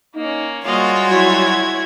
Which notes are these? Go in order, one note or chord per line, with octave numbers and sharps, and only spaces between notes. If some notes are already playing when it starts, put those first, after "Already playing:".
A#3 C#4 D#4
G3 G#3 A#3 F4 F#4 C#5 D#5 F5
F#3 E4 G#6